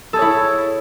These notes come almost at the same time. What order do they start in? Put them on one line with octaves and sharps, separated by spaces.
A4 G#4 C#5 E4